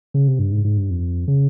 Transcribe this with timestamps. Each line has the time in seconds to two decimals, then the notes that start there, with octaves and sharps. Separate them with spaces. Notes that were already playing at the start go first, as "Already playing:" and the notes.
0.14 C#3
0.28 C3
0.39 G2
0.52 G#2
0.65 G#2
0.78 G2
0.91 F2
1.28 C#3